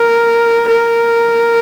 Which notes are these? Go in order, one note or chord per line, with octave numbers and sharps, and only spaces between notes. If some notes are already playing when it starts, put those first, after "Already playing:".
Already playing: A#4
A#4